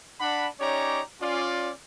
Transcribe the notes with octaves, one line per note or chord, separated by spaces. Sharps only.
D4 F#5 B5
C#4 D#4 G4 C#5 D5 A#5
C#4 F4 D5